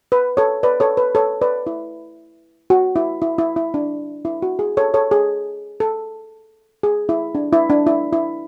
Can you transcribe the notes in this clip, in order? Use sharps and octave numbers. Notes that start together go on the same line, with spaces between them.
B4
A4 C#5
B4 D5
A4 C#5
B4
A4 C#5
B4 D5
E4
F#4
E4
E4
E4
E4
D4
E4
F#4
G#4
A4 C#5
A4 C#5
G#4
A4
G#4
E4
D4
E4
D4
E4
E4